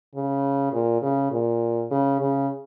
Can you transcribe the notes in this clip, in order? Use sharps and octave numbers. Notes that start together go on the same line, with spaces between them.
C#3
A#2
C#3
A#2
C#3
C#3